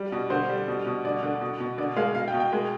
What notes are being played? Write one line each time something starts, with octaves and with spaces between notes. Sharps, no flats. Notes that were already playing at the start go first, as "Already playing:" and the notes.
Already playing: G3
B2
D3 C5
G3
B2
B2
D3 D5
D3
B2
B2
D3 D5
G#3 F5
B2 F5
G5
B2
G5
G#3